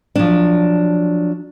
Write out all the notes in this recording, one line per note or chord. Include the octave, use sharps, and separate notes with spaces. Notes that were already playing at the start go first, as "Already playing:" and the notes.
F3 F#3 D4